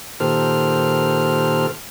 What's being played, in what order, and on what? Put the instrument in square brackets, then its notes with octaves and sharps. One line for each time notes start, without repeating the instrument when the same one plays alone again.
[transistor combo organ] A#2 D#3 G4 A4 C5 F6